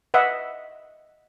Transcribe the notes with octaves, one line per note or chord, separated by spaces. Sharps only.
B4 D#5 E5 F#5